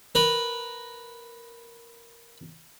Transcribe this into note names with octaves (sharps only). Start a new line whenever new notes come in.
A#4 B4